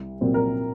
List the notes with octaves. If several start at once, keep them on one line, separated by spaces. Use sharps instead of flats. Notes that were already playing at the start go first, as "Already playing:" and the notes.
Already playing: C2
A#2 F#3 C4
A#4